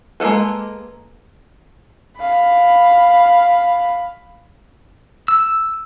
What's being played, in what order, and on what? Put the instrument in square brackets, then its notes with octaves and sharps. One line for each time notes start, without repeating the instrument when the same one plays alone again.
[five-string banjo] G#3 A#3 D#4 A4 B4
[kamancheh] F5 B5
[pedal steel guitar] E6